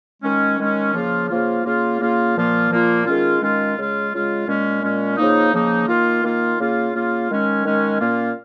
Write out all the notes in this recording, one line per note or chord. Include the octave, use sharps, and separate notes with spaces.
D#3 G#3 C#4
D#3 G#3 C#4
C#3 F3 A#3 F4
C#3 F3 A#3 F4
C#3 A#3 F4
C#3 A#3 F4
A#2 F3 A#3 F4
A#2 F3 A#3 F4
D#3 G#3 C#4 F4
D#3 G#3 C#4 F4
C#3 G#3 F4
C#3 G#3 F4
A#2 G#3 C#4
A#2 G#3 C#4
C#3 F3 A#3 D#4
C#3 F3 A#3 D#4
D#3 A#3 F4
D#3 A#3 F4
C#3 A#3 F4
C#3 A#3 F4
D#3 G#3 C#4
D#3 G#3 C#4
A#2 A#3 C#4 F4